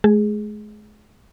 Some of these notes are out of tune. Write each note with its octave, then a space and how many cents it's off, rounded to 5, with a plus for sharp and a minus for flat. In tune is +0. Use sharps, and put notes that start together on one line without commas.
G#3 +40 G#4 +0